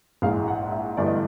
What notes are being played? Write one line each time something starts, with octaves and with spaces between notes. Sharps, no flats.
A#1 G#2 E3 G#3 F5
F#5
E5
G1 G2 E3 A3 D5
D#5